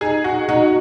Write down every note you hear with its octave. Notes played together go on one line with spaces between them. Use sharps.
D#4 G#4
F#4
D#4 F#4